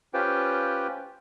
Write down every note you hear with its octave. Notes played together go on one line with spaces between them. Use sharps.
C#4 F4 G4 B4 C5 G5